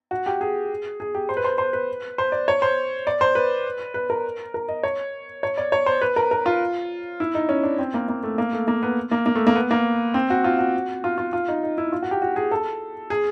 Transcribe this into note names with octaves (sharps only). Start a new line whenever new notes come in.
F#4
G4
G#4
G#4
G4
C5
B4
C5
C5
B4
C5
D5
C#5
C5
D5
C5
B4
B4
A#4
A#4
D#5
C#5
C#5
D5
C#5
C5
B4
A#4
A#4
F4
E4
D#4
C#4
D4
C4
A#3
A#3
A3
A#3
A3
A#3
B3
A#3
A#3
A3
A#3
B3
A#3
C4
F#4
F4
F#4
F4
F4
F4
D#4
D#4
E4
F4
F#4
G4
F#4
G#4
A4
G#4